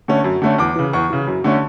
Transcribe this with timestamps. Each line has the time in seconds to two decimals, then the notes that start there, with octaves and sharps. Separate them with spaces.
0.08 D3 A3 C#4
0.24 F#2
0.42 D3 A3 C#4
0.58 E2 D6
0.76 C#3 E3
0.93 E2 C#6
1.10 C#3 E3
1.27 F#2
1.44 D3 A3 C#4